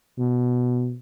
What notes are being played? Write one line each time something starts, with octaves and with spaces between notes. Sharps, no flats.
B2